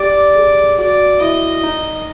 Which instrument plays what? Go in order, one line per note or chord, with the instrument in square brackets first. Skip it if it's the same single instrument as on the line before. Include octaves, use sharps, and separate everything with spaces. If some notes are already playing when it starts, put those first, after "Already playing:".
Already playing: [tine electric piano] G4 [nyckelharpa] D5
[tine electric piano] G#4
[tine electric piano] F#4 [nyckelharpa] D5
[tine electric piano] E4 [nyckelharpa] D#5
[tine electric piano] D#4